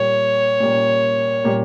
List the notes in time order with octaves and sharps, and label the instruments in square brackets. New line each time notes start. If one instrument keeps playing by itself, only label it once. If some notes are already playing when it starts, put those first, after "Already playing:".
Already playing: [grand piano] A#2 G3 A#3 [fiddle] C#5
[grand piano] A#2 G3 A#3
A#2 G3 A#3